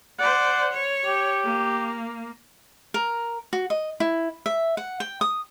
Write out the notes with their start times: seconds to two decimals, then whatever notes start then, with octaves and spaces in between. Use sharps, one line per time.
0.19 C5 D5 F#5
0.73 C#5
1.06 G4
1.44 A#3
2.94 A#4
3.53 F#4
3.70 D#5
4.00 E4
4.46 E5
4.77 F#5
5.00 G5
5.21 D#6